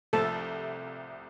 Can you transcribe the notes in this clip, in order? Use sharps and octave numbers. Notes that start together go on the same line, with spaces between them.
C2 C3 F3 A3 A4 A5